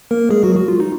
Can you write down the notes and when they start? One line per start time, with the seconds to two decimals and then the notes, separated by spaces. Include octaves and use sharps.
0.11 A#3 A#4
0.30 G#3 G#4
0.43 F#3 F#4
0.56 F#4
0.68 F4
0.80 D#4